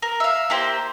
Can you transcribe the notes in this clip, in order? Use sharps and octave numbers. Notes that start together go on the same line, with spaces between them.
A#4
E5 F5
A#3 E4 G4 C5